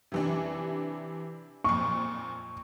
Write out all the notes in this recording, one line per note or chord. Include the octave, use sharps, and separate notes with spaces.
C3 E3 D4
F2 A#2 C#6